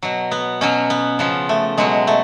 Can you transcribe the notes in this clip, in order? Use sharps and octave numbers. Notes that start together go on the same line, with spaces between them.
B2 F#3
B3
B2 F#3 C#4
B3
C#3 F3 B3
A3
B2 F#3 G#3
A3